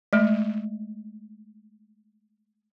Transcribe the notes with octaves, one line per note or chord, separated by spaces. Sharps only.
G#3 A3